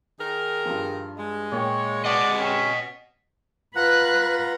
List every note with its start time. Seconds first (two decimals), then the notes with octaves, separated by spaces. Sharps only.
0.19 D#3 G#4 A#4
0.65 G2 F3
1.18 G#3
1.52 A#2 C#5 G5
2.05 D5 D#5 F#5
2.39 C#4 G5 E7
3.76 F4 B4 F#5 A#5 F#6